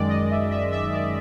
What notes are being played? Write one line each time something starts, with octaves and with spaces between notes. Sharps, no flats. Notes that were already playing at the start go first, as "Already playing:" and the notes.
Already playing: F#2 D#3 G#3 D5
D#5
E5
E5
E5
D5